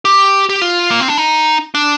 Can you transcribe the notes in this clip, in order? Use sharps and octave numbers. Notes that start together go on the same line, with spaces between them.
G4
G4
F4
A#3
C4
D4
D#4
D4